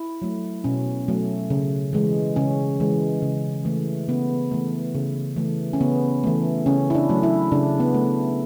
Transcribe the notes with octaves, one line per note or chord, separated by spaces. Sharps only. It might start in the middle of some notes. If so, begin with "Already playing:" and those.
Already playing: E4
F#3 A3
B2 C#4
F#3 A3
C#3
E3 G#3
C#3 C#4
E3 G#3
C#3
E3 A3
C#3 B3
E3 A3
C#3
E3 A3
C#4
C#3 B3
E3 A3
C#3 C#4
E4
D4
F#3 A3
E4
C#3 D4
B3
A3